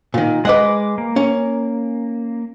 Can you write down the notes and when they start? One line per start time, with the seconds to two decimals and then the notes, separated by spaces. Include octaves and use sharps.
0.14 A#2 D#3
0.45 G#3 B4 D#5 F#5 D6
0.98 A#3
1.16 C#4